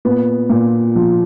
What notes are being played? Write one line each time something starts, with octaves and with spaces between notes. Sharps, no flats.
A#2 B3
A#2
F3